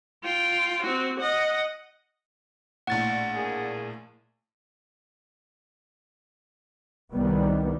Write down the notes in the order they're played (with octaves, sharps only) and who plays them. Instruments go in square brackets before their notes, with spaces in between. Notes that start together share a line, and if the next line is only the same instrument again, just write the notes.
[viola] F4 G5
C4 F#4
D#5 F#5
[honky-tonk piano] A#1 A2 [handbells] F#5 A6
[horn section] A#3 D4 G#4
[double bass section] C2 D#3 G3 B3